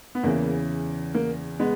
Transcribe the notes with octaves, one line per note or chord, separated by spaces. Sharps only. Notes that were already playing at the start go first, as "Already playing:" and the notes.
B3
E2 C#3 E3 A#3
A#3
G#3 B3